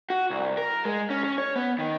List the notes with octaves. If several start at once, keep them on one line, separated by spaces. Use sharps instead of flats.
F#4
C2
A#4
G#3
C#4
C#4
C#5
B3
D#3